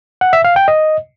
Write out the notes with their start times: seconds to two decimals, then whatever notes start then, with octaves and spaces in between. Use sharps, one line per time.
0.21 F#5
0.33 E5
0.45 F5
0.56 G5
0.68 D#5